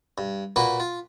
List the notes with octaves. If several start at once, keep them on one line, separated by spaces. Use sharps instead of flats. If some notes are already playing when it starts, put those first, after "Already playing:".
G2
A#2 A#3 F#4 B4 B5
F4